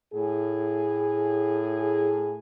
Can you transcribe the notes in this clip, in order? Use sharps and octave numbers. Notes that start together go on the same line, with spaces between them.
A2 G#4